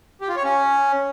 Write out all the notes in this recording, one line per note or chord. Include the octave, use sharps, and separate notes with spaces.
G4
F4
C#5
C#4